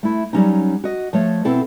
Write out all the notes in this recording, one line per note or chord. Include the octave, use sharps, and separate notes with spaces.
A3 E4
F#3 G3 A3 C#4 D#4
F#4 D#5
F3 A3 C#5
B2 C4 E4 A4